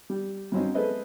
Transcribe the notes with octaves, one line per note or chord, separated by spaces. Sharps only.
G3
G2 F#3 C4 C#4 D#4
G#3 A4 B4 C5 D#5 E5